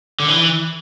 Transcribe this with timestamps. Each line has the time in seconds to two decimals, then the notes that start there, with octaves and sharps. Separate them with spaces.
0.20 D3
0.28 E3